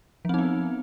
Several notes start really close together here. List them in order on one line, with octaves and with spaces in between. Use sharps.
F3 C4 D#4 B3